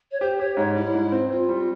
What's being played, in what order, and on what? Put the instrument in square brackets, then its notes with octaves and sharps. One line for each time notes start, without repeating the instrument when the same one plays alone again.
[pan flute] C#5
[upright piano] G4 [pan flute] C5
[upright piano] G4 [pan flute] C#5
[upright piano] G#2 [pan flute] C#5
[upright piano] G3 [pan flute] E4
[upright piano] G#2
C4
[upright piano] C4 [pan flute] F4
[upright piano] G3